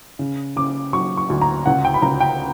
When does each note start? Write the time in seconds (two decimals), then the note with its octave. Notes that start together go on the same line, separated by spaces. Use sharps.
0.19 C#3
0.56 C#3 D6
0.93 F#3 C#6
1.17 C#6
1.30 D2
1.42 A#5
1.66 C#2 F#5
1.85 G5
1.94 B5
2.02 C#2 A#5
2.20 G5